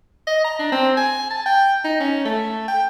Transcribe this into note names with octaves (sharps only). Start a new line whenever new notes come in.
D#5
A#5
D4
C4
G#5
A5
G5
D#4
C#4
A3
G5